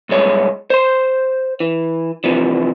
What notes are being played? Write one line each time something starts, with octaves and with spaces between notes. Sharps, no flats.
B1 G2 G#3 C#5
C5 C6
E3
C3 E3 F3